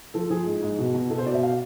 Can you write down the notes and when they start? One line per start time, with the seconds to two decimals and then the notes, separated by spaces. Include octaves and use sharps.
0.14 F3 A4
0.30 F3 G#4
0.46 G#2 G#4
0.63 G#2
0.78 B2
0.94 B2
1.10 B2 A4
1.18 C5
1.26 B2 D5
1.34 E5
1.43 F5